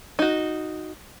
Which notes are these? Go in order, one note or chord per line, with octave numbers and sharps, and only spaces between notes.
D#4 F#4